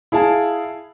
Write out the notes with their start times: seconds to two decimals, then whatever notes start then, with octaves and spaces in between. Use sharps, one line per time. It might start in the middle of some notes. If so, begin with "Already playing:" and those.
0.12 E4 G#4 F5 A5